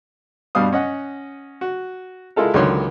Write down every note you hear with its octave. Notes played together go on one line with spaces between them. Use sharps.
G2 B2 G3 F5 D#6
C#4 D#5 F#5
F#4
G#3 E4 F4 A4 A#4
C#2 D3 D#3 F#3 C#5 C6